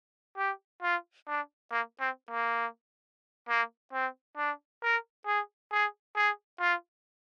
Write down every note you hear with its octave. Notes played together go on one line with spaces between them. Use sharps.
G4
F4
D4
A#3
C4
A#3
A#3
C4
D4
A#4
G#4
G#4
G#4
F4